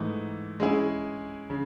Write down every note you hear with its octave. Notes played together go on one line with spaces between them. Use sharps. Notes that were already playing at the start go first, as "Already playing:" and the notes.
Already playing: G#2 E3 A3 D#4
G#3 C#4 E4 G#4
C#3